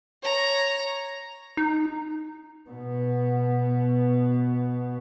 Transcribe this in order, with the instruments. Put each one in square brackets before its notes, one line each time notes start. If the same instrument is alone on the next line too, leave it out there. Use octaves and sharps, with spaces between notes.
[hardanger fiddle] C#5 A#5
[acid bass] D#4
[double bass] B2 B3